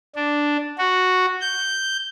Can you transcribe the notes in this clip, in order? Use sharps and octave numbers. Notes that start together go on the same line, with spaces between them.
D4
F#4
G6